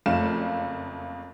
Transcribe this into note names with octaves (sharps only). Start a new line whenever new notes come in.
F#1 F2 A3 F5 E7